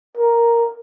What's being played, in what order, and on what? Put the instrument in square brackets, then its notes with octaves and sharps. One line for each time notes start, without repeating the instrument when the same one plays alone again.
[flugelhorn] A#4